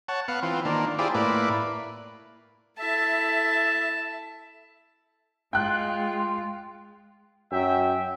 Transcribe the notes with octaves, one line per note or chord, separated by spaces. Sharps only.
C#5 F#5 A5
B3 F5 F#5
E3 C4 F4
D#3 A#3 D4
E4 F4 G4 G#4 C5 D5
A2 A#3 E4 B4 D5
E4 A4 E5 A5
G#3 F4 G5 F#6
F#2 E5 G5